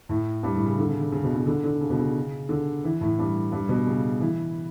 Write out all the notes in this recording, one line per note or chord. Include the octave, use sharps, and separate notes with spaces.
A2
G2
A2
C#3
D3
C#3
D3
C#3
B2
C#3
D3
D3
C#3
B2
C#3
D3
E3
A2
G2
G2
B2
C#3
E3